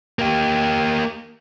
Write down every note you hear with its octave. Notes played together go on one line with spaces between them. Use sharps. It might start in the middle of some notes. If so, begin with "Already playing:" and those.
A#3 G4